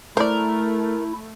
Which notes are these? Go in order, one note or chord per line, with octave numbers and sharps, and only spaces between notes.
A3 E4 A#4 C5 D5